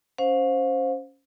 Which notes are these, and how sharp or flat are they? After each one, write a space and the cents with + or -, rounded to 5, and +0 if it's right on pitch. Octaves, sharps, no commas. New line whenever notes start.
C#4 +0 C5 +0 F5 +35